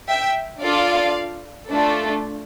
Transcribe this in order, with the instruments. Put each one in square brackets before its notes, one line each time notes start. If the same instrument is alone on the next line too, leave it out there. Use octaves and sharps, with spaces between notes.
[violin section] E5 G5
D4 F4 A4 D5 F5
A3 D4 F4 A4